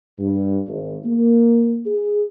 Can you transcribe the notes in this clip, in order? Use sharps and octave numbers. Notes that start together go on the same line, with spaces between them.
G2
G#1
A#3
G#4